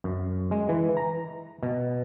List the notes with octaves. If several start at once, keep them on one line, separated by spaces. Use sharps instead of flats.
F#2
G#3
E3
A#5
B2